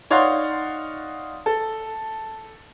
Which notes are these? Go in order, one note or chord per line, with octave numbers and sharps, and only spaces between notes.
D#4 C#5 D5 F5 F#5 C6
A4